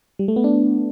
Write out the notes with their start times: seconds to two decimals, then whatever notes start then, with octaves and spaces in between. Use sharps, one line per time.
0.19 G3
0.28 A3
0.36 B3
0.44 D4